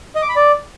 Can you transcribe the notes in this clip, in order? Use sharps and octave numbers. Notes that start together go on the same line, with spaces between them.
D#5
D6
B5
D5